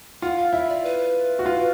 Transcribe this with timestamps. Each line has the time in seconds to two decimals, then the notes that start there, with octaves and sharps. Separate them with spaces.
0.22 F4 F#5
0.37 F5
0.53 E4 E5
0.69 D5
0.83 B4
1.39 F#4
1.46 F4